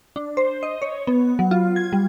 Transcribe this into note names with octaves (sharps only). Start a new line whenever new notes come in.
D4
C5
D#5
C#5
B3
F#3
F4
G#6
G3